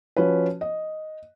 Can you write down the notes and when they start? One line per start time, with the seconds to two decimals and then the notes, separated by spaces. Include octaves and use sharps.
0.17 F3 C#4 F#4 B4
0.61 D#5